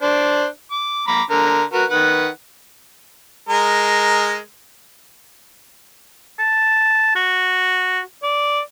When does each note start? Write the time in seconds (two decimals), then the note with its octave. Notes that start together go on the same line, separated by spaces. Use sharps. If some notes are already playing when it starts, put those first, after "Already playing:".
0.02 D4 C5 D5
0.71 D6
1.08 A#5 B5 D6
1.31 D3 A#4 A#5
1.73 F#4 A#4 B4
1.90 D#3 B4 F#5
3.49 G#3 A#4
6.39 A5
7.15 F#4
8.23 D5